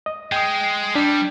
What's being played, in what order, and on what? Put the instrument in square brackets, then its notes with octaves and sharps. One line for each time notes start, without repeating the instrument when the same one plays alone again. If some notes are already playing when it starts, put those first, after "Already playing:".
[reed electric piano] D#5
[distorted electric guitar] G#3 [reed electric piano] G5 D#6
[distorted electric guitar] G3 [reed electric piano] D4